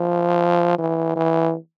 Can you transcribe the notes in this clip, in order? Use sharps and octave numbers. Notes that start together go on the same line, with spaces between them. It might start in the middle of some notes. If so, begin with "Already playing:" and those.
Already playing: F3
E3
E3